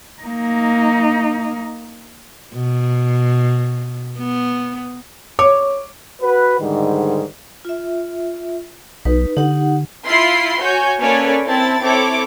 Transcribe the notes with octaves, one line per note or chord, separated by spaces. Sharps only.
A#3 D#4
B2
B3
C#5 D6
F#4 B4
G#2 D3 D#3 G3
F4 E5
B1 D#4 B4
D3 D#4 G4 F#5
E4 F4 B5 C6 C7
F#4 C#5 G#5 G6
A#3 C#4 A4 B4 C#5 D5
C4 E4 A5 A6
C4 E4 A4 C#5 D6